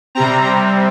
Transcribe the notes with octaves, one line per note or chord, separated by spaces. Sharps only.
C3 G3 C4 A#5